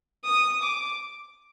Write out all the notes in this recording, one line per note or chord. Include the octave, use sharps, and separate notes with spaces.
D#6
D6